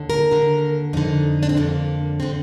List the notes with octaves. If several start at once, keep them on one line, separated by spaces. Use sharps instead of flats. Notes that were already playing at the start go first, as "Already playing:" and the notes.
Already playing: D#2 D3
A#4
D#2 D3
F2 D3 D#4
D4
C4
F2 D3 A#3
D3 C4